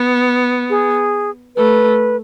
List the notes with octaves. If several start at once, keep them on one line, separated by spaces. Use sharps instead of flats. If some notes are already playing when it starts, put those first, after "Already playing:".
Already playing: B3
G#4
A3 B4